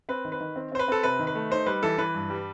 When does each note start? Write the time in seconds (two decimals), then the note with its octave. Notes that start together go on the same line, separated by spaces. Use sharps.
0.09 C4 B4
0.25 D#3
0.32 B4
0.40 D#3
0.56 C4
0.72 C4 C5
0.79 B4
0.88 C4 A4
1.03 C3 B4
1.19 D#3
1.27 B4
1.35 A3
1.50 D#4 C5
1.66 G3 B4
1.83 E3 A4
1.98 E3 B4
2.15 G2
2.30 G3